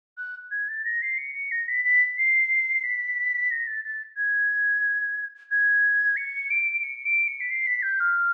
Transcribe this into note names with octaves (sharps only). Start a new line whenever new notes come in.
F#6
G#6
A6
A#6
C7
C#7
C#7
A#6
B6
B6
C7
B6
A#6
A6
A6
G#6
G#6
C#7
D7
C#7
D7
C#7
B6
C7
B6
G6
F6